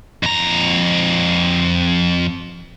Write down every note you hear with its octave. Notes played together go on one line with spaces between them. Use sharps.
F2 A#5